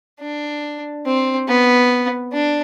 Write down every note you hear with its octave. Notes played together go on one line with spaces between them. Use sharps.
D4
C4
B3
D4